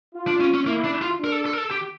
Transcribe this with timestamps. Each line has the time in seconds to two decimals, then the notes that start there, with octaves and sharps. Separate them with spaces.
0.14 F4
0.27 D4
0.40 C#4
0.54 C#4
0.66 A#3 E4
0.84 D4
1.02 F4
1.20 D4 A#4
1.32 A4
1.46 A4
1.53 A#4
1.58 A4
1.71 G4